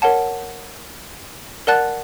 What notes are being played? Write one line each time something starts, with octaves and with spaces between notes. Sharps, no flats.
A#4 C#5 F#5 A5
A#4 D5 F#5 A5 F#6 A6